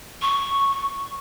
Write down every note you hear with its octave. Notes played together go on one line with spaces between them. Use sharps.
C#6